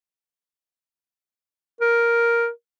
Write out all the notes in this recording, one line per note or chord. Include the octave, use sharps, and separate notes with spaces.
A#4